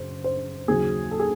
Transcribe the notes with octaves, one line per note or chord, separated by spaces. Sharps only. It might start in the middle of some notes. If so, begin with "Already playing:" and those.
Already playing: F#2 C#3 C5
C5
D#2 C#3 F#3 G#4
A4
G#4